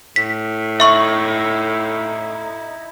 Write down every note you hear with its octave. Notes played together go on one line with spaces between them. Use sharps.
A2 B6
D#4 E4 E5 C#6 F#7